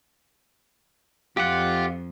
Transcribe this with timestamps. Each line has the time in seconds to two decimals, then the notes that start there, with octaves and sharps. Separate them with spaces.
1.37 F2 F4 G4 F5 F#5